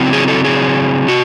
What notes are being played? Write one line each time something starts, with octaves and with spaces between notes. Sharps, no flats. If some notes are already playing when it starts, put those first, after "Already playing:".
Already playing: C#3 F#3 C4 E4
G#4
A4
G#4
C3 F#4